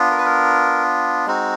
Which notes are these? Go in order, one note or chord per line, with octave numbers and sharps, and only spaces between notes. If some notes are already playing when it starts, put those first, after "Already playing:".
Already playing: B3 D4 F4
A#4
B4
A#4
G#3 C4 D#4 F#4